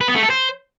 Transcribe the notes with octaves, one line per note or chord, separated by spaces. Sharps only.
B4
B3
A3
A4
C5